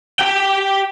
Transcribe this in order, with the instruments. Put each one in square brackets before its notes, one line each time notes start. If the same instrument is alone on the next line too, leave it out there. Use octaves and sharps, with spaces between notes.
[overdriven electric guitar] G4 G5